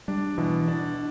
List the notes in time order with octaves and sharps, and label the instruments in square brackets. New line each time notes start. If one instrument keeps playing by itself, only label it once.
[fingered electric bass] G3 [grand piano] D4
[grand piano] B2 [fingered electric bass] E3
[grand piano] D4